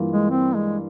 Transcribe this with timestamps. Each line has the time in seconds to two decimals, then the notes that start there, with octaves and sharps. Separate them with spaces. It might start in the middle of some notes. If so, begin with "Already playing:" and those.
Already playing: G2 E3 A#3 F4
0.11 G#3
0.30 C4
0.55 G#3